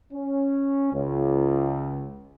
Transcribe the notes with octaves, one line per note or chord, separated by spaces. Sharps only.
C#4
C#2